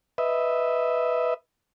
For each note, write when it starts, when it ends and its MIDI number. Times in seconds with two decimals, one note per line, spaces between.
0.18 1.34 71
0.18 1.34 75
0.18 1.34 76